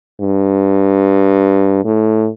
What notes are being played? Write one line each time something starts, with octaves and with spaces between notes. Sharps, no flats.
G2
A2